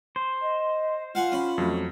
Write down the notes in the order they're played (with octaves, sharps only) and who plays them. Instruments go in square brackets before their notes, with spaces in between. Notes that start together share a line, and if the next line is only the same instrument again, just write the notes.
[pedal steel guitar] C5
[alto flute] D#5
[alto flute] F4 [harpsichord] F5 F#5 G#5
[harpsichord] C#4 B5
[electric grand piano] F2 F#3 A3